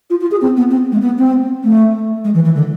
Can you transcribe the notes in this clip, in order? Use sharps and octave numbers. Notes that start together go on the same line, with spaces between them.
F4
F4
G#4
C4
B3
C4
G#3
B3
C4
A3
G#3
E3
E3
D3